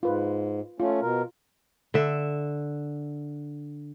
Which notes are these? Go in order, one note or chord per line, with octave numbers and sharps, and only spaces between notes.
G#2 F4 B4
A3 C#4 F4
B2 A#4
D3 E5